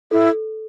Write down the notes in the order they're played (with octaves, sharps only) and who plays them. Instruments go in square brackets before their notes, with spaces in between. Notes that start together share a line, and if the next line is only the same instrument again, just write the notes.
[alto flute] E4 [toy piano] A4